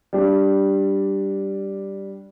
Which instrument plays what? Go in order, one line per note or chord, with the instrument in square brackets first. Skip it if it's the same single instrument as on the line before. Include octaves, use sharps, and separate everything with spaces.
[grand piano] G3 D4